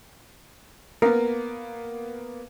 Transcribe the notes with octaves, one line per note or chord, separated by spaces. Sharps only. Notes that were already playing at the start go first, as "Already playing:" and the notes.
A#3 B3 A#4